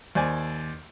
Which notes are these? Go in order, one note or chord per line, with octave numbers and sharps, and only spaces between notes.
D#2 C5 D5 G#5